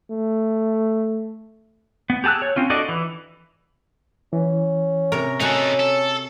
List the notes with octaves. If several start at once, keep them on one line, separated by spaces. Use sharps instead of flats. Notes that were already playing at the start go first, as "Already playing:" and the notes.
A3
B3
G4 G#4 A5 E6 F#6
C#5
C4 C#4 F4
D4 F#4 A4 D5 D#5
E3
E3 C#4
C3 A#4 C#5
D#4 F#4 A4 G#5 A#5
A4